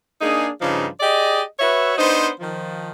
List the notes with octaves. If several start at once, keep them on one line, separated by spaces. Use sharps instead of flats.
A#3 D4 D#4 G#4
G2 C#3 F3 D4 D#4
G4 G#4 D5 D#5
F#4 B4 C#5 E5
B3 D4 D#4 C5
D#3 F3